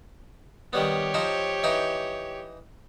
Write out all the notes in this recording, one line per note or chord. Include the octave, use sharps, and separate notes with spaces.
D#3 G3 B3 G4 C#5
F3 D#4 C5
E3 D#4 G5